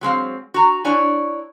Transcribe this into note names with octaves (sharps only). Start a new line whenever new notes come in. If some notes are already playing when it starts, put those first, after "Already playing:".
F#3 G#3 C4 F5
F#4 A#5
D4 E4 C#5 D5 G#5